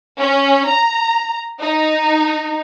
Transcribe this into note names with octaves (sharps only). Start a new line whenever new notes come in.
C#4
A#5
D#4